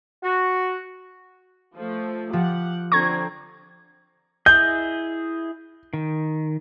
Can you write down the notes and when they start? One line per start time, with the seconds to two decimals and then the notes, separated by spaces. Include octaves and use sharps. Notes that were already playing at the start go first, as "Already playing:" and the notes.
0.23 F#4
1.76 F3 A3
2.33 F3 G4 F#5
2.92 D3 F3 C4 A#5 C#6 G#6
4.46 E4 G#4 D#5 G6
5.94 D#3